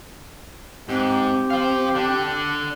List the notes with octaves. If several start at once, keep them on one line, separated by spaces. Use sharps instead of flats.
G#2 C4 G4
C5 F5
D3 D4